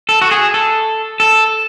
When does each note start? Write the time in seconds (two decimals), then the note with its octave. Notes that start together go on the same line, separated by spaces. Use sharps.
0.09 A4
0.22 F#4
0.31 G#4
0.54 A4
1.20 A4